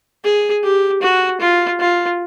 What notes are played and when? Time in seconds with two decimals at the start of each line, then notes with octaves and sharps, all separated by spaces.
0.24 G#4
0.63 G4
1.02 F#4
1.41 F4
1.80 F4